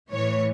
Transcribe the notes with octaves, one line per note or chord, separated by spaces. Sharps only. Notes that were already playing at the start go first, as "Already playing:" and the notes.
A2 E3 C#5